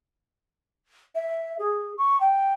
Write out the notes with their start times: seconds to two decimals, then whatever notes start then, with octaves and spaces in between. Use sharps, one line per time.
1.15 E5
1.59 G#4
1.98 C#6
2.20 G5